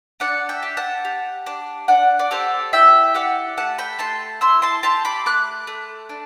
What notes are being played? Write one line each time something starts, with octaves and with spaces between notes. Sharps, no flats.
D4 D5 F#5
E5 G5
G4
F#5 A5
G4
D4
D4 D5 F#5
D5
G4 A4 C5
E4 E5 G5
G4 D5 F#5
A3 F#5 A5
G5 B5
A3 A5 C6
E4 C6 E6
A5 C6
G4 A5 C6
B5 D6
A3 D6 F#6
A3
D4